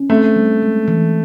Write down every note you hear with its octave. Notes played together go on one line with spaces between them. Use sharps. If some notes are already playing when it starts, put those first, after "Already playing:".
Already playing: C#4
A3 C4
G3
G#3
E3